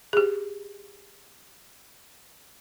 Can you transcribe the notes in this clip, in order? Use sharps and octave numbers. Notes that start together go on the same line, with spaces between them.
G4 G#4